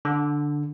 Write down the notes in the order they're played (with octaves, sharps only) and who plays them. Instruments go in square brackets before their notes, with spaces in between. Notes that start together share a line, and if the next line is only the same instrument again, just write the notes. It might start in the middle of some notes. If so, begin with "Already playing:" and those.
[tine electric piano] D3